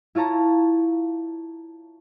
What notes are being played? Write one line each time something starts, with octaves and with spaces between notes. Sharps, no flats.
E4 F4 C#5 A5 A#5